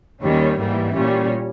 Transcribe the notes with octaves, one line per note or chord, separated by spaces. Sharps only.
D#2 D#3 G3 C#4
G#2 E3 G3 A#3
A#2 G3 C#4